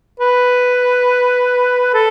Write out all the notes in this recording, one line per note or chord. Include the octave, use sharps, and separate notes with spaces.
B4
A4